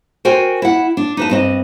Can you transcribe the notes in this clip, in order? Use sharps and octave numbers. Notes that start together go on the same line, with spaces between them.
F#4 A#4 C5 G5 G#5
E4 F#5
D4
D#4 B4 A5
G2 C4 D#5